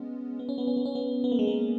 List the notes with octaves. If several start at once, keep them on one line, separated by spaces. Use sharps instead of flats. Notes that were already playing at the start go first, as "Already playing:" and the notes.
Already playing: G#3 B3 C#4
B3
C#4
B3
C#4
B3
C#4
B3
B3
A#3
G#3
A#3